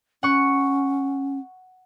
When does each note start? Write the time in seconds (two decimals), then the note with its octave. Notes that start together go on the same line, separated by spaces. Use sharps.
0.23 C#4 F#5 C#6